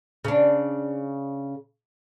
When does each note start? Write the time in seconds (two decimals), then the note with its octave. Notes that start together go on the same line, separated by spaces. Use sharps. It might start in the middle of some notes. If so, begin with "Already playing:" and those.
0.24 C#3 D4